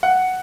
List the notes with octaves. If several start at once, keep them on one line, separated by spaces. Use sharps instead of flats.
F#5